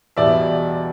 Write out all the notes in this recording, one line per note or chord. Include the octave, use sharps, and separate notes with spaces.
E2 B2 G3 D5 E5